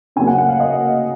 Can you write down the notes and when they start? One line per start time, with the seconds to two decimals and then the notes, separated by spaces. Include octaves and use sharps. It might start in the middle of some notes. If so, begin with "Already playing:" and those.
0.16 C#3 F#3 A#3 G#5
0.27 F#5
0.38 F#5
0.48 F5
0.60 D#5